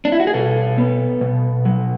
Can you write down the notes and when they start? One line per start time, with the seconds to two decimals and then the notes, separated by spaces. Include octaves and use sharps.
0.05 D4
0.12 E4
0.20 F#4
0.27 G#4
0.34 B2 A4
0.78 B3
1.21 B2
1.65 F#3